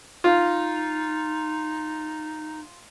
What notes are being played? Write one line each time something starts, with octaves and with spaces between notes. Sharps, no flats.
D#4 F4